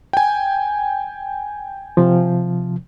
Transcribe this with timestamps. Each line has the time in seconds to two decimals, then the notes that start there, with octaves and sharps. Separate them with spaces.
0.13 G5 G#5
1.97 C3 F3